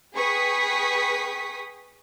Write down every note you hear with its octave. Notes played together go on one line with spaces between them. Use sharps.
G#4 B4 G5 C#6 D#6 B6